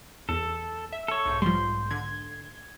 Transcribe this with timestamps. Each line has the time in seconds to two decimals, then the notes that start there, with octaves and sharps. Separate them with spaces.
0.29 E2 A4
0.92 E5
1.08 A4 C#5
1.26 B1 G#2 G6
1.42 F3 G3 C6
1.91 D3 G#6